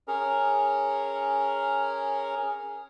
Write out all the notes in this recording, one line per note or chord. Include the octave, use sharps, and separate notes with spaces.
C#4 G#4 A#4